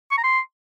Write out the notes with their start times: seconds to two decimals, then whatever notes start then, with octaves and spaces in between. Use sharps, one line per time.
0.11 C#6
0.17 A#5
0.24 C6